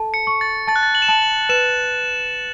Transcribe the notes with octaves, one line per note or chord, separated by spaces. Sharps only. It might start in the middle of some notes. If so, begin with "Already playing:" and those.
Already playing: A4 A5
C#7
C#6
A6
A5 A6
F#6
A6
F#7
E7
A5 F#7
F#7
B4 E7